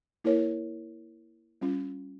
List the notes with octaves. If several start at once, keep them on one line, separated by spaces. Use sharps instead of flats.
A#3 E4 A#4 C#5
G3 C#4 F4